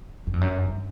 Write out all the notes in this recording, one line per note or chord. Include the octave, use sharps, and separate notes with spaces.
F#2
F2
F#2
G2